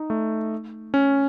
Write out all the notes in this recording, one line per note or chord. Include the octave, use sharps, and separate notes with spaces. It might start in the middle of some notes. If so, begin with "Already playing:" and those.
Already playing: D#4
A3
C#4